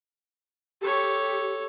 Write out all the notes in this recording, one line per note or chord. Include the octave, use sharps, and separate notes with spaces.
G4 A4 C#5